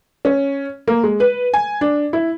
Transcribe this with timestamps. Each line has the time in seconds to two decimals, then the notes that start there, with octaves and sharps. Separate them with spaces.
0.25 C#4
0.88 A#3
1.03 G#3
1.20 B4
1.54 G#5
1.81 D4
2.13 E4